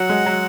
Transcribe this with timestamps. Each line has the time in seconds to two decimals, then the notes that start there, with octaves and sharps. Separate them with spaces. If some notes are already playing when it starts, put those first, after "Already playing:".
Already playing: F#3 F#5
0.09 G#3
0.26 F#3